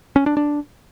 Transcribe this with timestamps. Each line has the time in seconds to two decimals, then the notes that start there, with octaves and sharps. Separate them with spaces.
0.16 C#4
0.26 D4
0.37 D4